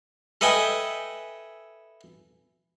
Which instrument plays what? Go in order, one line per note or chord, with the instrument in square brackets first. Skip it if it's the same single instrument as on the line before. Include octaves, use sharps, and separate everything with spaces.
[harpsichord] A4 B4 D#5 E5 G5 G#5